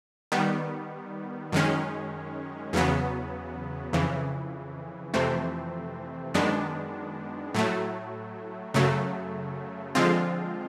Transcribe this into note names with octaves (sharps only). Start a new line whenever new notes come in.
D#3 G3 B3
F#2 D#3 G#3 C#4
E2 C#3 F#3 B3
F2 C#3 E3
F2 C3 E3 A3 C4
F#2 D#3 G#3 B3 D4
A2 F#3 A3
F#2 C#3 F#3 A3
D3 F3 G#3 C4 F4